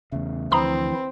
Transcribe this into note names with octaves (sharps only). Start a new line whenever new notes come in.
E2 C#3 A3
D2 E3 F3 C4 E4 A#5 B5 D#6